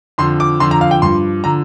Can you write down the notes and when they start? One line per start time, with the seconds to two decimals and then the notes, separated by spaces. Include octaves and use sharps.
0.18 F2 D3 F3 C6
0.40 D6
0.60 F2 D3 F3 C6
0.71 A#5
0.81 F5
0.91 G5
1.02 G2 F3 C6
1.44 D3 F3 A#5